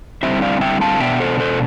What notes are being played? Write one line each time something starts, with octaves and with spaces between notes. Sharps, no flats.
D3 G3 C4 E4 C5 E5
D5 F5
E5 G5
F5 A5
B2 B3 D4 E5 G5
A4 C5
A4 C5